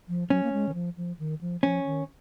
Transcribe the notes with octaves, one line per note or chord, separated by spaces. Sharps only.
F3
F#3 C#4
A#3
G#3
D#3
F3
F3
D#3
F3
F3 C#4
D#3